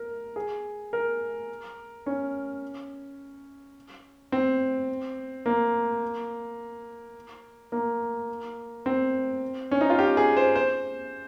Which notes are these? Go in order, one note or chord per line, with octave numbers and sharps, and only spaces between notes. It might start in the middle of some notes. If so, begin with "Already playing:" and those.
Already playing: A#4
G#4
A#4
C#4
C4
A#3
A#3
C4
C#4
D#4
F4
G4
G#4
C5
C5